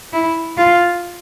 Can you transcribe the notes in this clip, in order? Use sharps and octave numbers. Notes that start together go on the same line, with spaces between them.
E4
F4